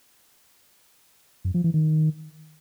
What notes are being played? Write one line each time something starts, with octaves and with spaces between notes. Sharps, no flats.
F#2
F3
E3
D#3